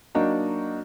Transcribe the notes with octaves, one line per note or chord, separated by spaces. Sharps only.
F#3 A#3 D4 D#4 F#4